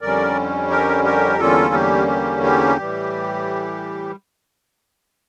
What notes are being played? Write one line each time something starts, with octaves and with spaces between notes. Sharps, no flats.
F2 D3 G3 C#4 A#4 D5
G4 A#4
G4 A#4
E2 D3 G3 A#3 C#4 F4 A4
G4
G4
G4
A2 E3 G3